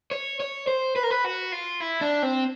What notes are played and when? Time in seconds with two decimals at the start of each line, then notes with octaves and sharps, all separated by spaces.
0.11 C#5
0.40 C#5
0.67 C5
0.96 B4
1.03 A#4
1.11 B4
1.24 F#4
1.52 F4
1.80 E4
2.01 D4
2.22 C4